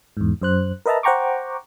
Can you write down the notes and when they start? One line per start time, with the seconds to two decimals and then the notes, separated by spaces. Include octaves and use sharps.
0.17 E2 G#2
0.42 F#2 C5 F#6
0.86 A#4 B4 D#5 E5 A5 A#5
1.03 C5 F#5 G5 A#5 C#6 D6